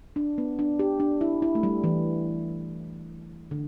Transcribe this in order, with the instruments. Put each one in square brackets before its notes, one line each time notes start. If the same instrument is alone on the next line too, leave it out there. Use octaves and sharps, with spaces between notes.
[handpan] D4
B3
D4
G4
D4
E4
E4
A3
G3
E3
D3